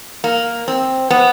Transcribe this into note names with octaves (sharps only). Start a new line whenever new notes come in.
A#3
C4
B3